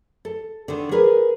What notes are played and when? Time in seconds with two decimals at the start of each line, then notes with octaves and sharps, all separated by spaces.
0.25 A4
0.68 D3 D#3
0.91 G#4 A#4 B4